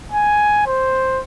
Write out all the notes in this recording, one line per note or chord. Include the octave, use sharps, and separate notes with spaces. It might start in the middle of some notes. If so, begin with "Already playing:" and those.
G#5
C5